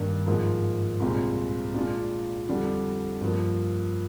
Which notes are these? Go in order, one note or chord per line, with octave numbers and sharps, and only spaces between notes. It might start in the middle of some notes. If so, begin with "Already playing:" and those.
Already playing: G2 D#3 A#3 D4
G#2 F3 A#3
C2 A#2 G#3 C4
A#2 G#3 D4 F4
F2 D3 G3 D4
G2 F3 A#3